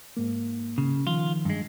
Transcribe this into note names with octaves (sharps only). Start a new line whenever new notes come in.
G#2 A#3
C#3
D#3 F3 F4
G2 G#3